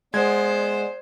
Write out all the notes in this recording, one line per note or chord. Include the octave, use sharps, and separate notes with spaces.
G#3 B3 C5 D5 G#6